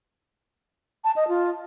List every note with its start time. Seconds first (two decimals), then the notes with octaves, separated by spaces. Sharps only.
1.04 A5
1.16 D#5
1.28 F4